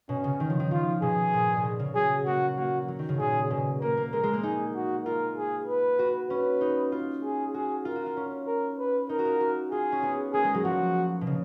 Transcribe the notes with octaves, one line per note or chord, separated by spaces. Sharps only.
B2 C#4
C#3
D#3
F3
D#3
F3 F4
B2 G#4
A#2
A#2
B2
C#3
F#3 G#4
A#3 F#4
A#3 F#4
F#3
D#3
C#3
A#2 G#4
B2 G#4
A#3 A#4
A#3
G#3 A#4
G#3
A#3
D#4 G#4
F#4
F4 A#4
G#4
B4
F#4
C#4 B4
D#4
F4
G#4
F#4 G#4
F4 A#4
F#4
F4
C#4
A#4
B4
D#4 A#4
F#4
F4
F#4
F4 G#4
C#4
B3
A#3 G#4
G#3
F#3
F3 F#4
B2
C#3